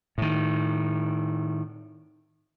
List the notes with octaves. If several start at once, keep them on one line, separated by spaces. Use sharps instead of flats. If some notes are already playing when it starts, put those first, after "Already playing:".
A2 D#3